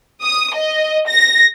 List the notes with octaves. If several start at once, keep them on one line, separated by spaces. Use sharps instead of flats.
D#6
D#5
A#6